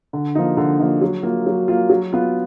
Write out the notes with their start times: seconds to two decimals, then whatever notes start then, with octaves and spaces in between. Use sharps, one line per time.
0.13 D3
0.35 F3 A#3 D#4
0.57 D3
0.80 F3 A#3 D#4
1.01 F#3
1.23 A#3 F4
1.46 F#3
1.68 A#3 F4
1.90 F#3
2.13 B3 F4